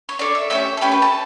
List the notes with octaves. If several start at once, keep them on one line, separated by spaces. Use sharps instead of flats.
C#5
D4 A4 D5
E5
A3 C#4 G4 E5
A4
A3 C#4 G4 B4
B4
A5